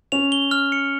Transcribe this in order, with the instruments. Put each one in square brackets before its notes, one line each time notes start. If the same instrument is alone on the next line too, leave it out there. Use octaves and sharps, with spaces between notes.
[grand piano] C#4 [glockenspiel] F7
[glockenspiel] G7
F6
C#7